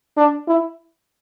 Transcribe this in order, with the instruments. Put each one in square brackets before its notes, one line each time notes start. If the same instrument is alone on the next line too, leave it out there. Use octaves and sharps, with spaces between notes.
[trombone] D4
E4